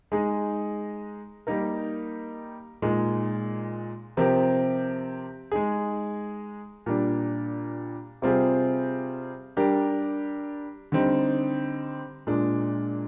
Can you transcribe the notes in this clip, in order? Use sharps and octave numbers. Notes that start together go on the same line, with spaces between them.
G#3 D#4 G#4
G3 A#3 D#4 A#4
A#2 G#3 D#4
C3 F3 C4 G4 A#4
G#3 D#4 G#4
A#2 G3 D4
C3 G3 C4 F4 G#4
G3 D4 G4 A#4
D3 G3 C4 D#4
A#2 G#3 D4